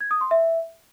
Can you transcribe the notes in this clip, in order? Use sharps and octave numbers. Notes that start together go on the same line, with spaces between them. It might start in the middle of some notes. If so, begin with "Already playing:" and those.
G#6
D#6
C6
E5